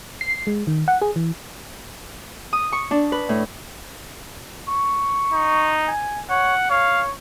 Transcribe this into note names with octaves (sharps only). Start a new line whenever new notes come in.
C7
G#3
D#3
F#5
G#4
E3
D#6
C#6
D4
B4
A2
C#6
D#4
G#5
C#5 F#5
C#5 F5